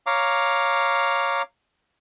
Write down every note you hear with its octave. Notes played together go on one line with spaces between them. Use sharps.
C#5 F5 A#5 D6